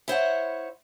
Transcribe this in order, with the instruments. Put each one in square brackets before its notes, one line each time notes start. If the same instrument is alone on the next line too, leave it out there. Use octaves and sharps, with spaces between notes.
[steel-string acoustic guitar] E4 C5 C#5 F#5